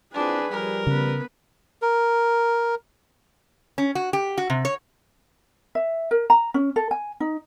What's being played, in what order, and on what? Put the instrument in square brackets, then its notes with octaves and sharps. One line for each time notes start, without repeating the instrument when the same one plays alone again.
[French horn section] C4 E4 F4 [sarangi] D4 [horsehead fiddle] G#4 B4
[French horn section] F3 G3 [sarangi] A#4
[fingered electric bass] C#3 [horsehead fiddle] B3 B4
[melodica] A#4
[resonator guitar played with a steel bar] C#4
F#4
G4
F#4
C3
C#5
[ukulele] E5
A#4
A#5
C#4
A4
G#5
D#4